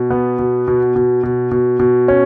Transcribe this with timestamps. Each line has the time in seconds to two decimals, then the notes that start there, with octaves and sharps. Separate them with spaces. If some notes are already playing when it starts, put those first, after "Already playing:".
Already playing: B2
0.10 B3
0.39 B2
0.68 B2
0.96 B2
1.23 B2
1.51 B2
1.79 B2
2.08 C#4